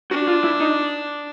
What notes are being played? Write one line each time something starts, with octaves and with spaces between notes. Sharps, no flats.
D4 F#4
F4
E4
D#4